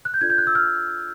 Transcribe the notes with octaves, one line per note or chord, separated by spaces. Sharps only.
F#6
G6
D4 F4 A4 D5 G#6
G6
F#6
E6
F6